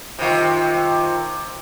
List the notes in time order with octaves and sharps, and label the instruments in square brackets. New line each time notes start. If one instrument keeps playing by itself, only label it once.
[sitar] C3 D#3 F4